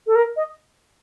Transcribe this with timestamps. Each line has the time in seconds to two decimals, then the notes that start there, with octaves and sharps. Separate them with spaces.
0.06 A4
0.15 A#4
0.36 D#5